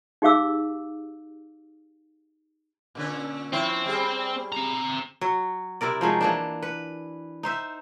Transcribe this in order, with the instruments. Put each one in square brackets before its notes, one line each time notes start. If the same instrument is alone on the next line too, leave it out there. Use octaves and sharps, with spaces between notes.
[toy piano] D#4 G4 G#4 F5 D6 E6
[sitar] A#2 D3 C#4
[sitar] F3 E4 C#5 [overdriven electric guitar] C4
[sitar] G3 G#4
[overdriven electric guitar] C4 A#5
[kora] F#3
C3 E4 A#4 D5
F3 F#3 G#3 D#4
E3 A#3 D4
B4
D#4 C5 E5